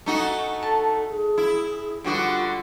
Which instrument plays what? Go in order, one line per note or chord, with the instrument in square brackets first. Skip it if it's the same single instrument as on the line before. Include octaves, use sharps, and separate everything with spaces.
[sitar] A3 D#4 F#4 [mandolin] G#5
[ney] A4 [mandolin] A5
[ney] G#4
[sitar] E4
[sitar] D3 G3 F#4 [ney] F4 [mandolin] B4 D#6